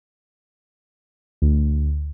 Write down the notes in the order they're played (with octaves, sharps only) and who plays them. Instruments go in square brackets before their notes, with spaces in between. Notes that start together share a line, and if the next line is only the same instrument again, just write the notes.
[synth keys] D2